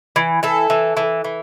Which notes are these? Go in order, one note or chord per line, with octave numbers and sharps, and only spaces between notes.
E3
E3 A4
E3
E3
E3